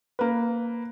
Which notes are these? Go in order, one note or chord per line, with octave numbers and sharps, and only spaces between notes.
A#3 B4